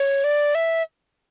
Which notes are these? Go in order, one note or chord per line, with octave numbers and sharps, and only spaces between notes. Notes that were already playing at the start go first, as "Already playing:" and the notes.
Already playing: C#5
D5
E5